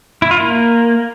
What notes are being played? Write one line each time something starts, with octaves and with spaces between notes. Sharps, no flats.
E4
F4
A#3